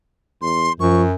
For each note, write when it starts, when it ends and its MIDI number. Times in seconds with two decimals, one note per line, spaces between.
0.42 0.69 40
0.42 0.73 84
0.80 1.15 42
0.80 1.04 53
0.80 1.02 85